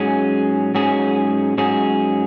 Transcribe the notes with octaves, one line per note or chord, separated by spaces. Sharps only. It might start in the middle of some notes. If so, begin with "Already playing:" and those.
Already playing: G#2 F#3 C#4 G#4
G#2 F#3 C#4 G#4
G#2 F#3 C#4 G#4